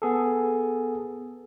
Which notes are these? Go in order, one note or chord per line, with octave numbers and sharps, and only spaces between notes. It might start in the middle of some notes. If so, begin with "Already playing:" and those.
B3 G#4 A4